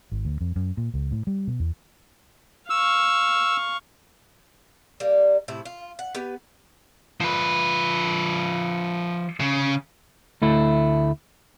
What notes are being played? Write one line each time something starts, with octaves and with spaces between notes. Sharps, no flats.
G#1
D2
F2
F#2
A#2
C#2
A2
G3
B2
E2
F5 C#6 E6
G3 A#3
A2 C3 E4
F4
F#5
B3 G4 B4
F3 B4
C#3
D2 A3 E4